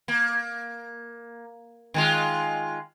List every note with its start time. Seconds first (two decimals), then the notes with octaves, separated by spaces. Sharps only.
0.08 A#3
1.94 D#3 G#3 F4